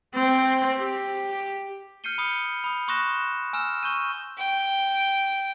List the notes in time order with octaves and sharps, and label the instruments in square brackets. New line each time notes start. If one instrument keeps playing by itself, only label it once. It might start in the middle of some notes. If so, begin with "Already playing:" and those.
[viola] C4
G4
[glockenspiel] F6 G6 C7 C#7 D#7 G7
B5 D#6 C#7
B5 D#6
C6 C#6 D#6 F#6 A#6 E7
G#5 E6 F6 E7
C#6 G6 D#7
[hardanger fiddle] G5